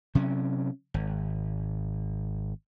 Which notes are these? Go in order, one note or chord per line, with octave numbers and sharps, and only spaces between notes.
C3 F#3 C#4
G#1